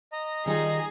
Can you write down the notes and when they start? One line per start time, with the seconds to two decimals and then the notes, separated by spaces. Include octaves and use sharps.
0.13 D#5 A#5
0.46 D#3 G3 D#4 F4 G#4